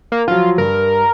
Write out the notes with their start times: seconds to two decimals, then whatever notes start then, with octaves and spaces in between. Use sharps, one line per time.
0.12 A#3
0.28 F3 F#3 F4
0.58 G2 A#4